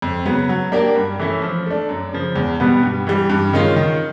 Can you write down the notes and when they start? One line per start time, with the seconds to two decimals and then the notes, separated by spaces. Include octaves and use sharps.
0.02 F2
0.25 C#3 F#3 B3
0.49 F#3
0.72 A#3 D4 G4 A#4
0.96 G2
1.19 E3 A3 C#4 E4
1.42 F3
1.66 A3 D4
1.89 F#2
2.13 C#3 F3
2.36 E2
2.60 B2 G3 B3
2.83 G2
3.07 E3 G3
3.30 G2
3.53 D#3 G#3 C#4 F4
3.76 D#3